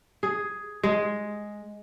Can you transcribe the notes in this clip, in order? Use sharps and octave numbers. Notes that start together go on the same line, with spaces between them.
G#4
G#3